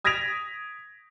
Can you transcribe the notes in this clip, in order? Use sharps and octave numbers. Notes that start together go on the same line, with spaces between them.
D#6 G#6 A#6 B6 D7 F7